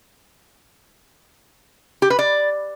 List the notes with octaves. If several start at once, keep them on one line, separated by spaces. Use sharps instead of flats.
G4
B4
D5